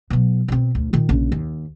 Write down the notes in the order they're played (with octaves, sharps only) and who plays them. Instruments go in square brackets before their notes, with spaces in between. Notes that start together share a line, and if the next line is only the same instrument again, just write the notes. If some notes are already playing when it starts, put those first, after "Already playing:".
[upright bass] B2 F#3
B2 C4
D2
A#2 D#3
A#1 C#3
D#2